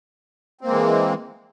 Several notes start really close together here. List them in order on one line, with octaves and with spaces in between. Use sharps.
C4 A#3 G#3 E3